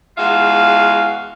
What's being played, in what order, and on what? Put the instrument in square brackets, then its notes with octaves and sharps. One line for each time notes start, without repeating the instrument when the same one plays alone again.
[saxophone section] E2 G#3 F4 F#4 E5 F5